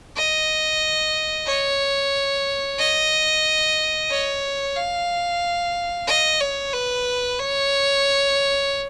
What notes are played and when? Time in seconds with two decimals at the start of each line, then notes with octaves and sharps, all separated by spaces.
0.16 D#5
1.47 C#5
2.79 D#5
4.10 C#5
4.76 F5
6.07 D#5
6.41 C#5
6.73 B4
7.39 C#5